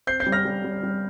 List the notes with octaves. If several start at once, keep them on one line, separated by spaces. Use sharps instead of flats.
C4 G6 C7
G6 C7
G3
F6 A#6
G3
G3
G3